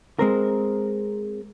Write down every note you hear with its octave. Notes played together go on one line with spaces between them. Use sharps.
G#3 C4 A#4